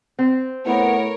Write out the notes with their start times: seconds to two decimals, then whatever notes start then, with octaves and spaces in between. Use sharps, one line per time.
0.19 C4
0.66 A2 B3 A#4 C#5